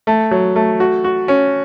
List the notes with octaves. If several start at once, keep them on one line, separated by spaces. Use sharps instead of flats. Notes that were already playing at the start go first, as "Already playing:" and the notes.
A3
F#3
A3
F#4
F#4
C#4